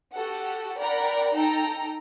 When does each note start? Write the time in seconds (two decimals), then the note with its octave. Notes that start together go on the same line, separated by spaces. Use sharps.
0.14 F#4 G4 A4 F#5
0.78 A#4 D5 F#5 G5 A#5 B5
1.34 D#4 A4 G5 A#5